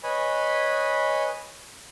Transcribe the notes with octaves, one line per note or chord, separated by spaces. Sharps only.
B4 C#5 D#5 G#5 B5